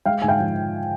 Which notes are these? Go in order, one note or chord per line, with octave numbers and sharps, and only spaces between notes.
G#3 F5 G5
G#2 G#5
F5 G5
F3